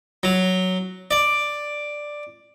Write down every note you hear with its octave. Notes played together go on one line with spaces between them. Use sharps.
F#3
D5